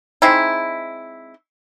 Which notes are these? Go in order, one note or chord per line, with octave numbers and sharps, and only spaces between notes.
G#3 C4 D#4 E4